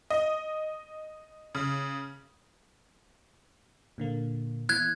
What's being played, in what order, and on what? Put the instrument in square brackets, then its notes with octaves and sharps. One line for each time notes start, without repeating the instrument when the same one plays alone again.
[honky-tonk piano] D#5
C#3
[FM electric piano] A#2 D3 A#3
[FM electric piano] E3 B3 E4 [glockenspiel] F#6 G#6